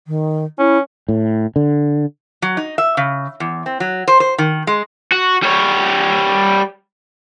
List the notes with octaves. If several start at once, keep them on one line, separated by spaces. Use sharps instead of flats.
D#3
C#4 E4
A2
D3
F#3
D#4
E5
C#3
E2
C4
F#3
C5
C5
D#3
G#3
F#4
G3 C#5